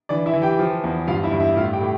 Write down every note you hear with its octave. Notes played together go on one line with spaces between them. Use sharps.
E3 D4 D5
E4 E5
E3
G4 G5
F3
E2
G2 F4 F5
E4 E5
G2
E4 E5
A2 F4 F5
G4 G5
A2